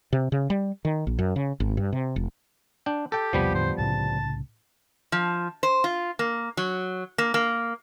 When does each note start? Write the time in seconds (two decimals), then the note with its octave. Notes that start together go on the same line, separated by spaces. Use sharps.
0.13 C3
0.32 C#3
0.50 G3
0.85 D#3
1.07 A#1
1.19 F#2
1.36 C#3
1.60 G#1
1.77 G2
1.93 C3
2.16 F1
2.86 D4 G5
3.12 G4 A4 G5
3.33 B1 E2 C3 F3 G3 B3
3.55 E2 A2 D3 C5
3.78 C2 A2 C#3 A5
5.12 F3
5.63 C5
5.84 F4
6.19 A#3
6.57 F#3
7.18 A#3
7.34 A#3